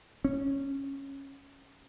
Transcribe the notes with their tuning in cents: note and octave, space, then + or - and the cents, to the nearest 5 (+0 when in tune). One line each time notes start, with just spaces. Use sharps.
C#4 -10